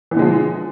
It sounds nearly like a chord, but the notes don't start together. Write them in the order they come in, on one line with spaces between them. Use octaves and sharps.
E3 B2 D3 G#3 F3